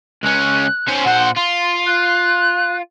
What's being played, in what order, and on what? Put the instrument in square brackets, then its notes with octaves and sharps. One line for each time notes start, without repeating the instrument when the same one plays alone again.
[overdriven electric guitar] C#2 C#4 [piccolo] F#6
[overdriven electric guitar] C#4 C5
[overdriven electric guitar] A#2 C5 [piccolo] F#5
[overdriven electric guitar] F4 [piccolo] C6
[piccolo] F#6